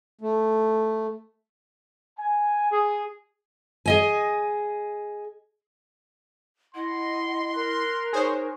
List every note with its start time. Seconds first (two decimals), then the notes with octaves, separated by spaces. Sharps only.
0.21 A3
2.18 G#5
2.70 G#4
3.86 G#4 D#5 G#5
6.75 E4 D#5 F#5 C6
7.55 A#4 F#6
8.13 D#4 G#4 C5 C#5